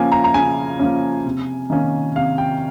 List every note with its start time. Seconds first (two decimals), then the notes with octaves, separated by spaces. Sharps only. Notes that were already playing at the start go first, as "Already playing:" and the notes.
Already playing: C#3 F3 A#3 C#4 G#5
0.12 A#5
0.24 A#5
0.34 C#3 G#5
0.79 F3 A#3 C#4
1.25 C3
1.70 D#3 A#3 C#4
2.16 C3 F5
2.38 G5